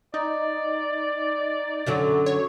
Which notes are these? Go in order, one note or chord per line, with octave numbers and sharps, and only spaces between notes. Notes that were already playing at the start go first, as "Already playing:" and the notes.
D#4 D5
F#2 D3 F#3
C#5